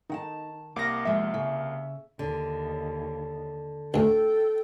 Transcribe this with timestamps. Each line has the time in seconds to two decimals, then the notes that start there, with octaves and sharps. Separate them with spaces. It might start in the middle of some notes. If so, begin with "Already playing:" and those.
0.10 D#3 D#4 F#5 A5
0.76 C2 A#3 F5 D6 A#6
1.05 F3 G#3 E5
1.34 C#3
2.19 D#2 D3
3.94 D2 A2 A4 G5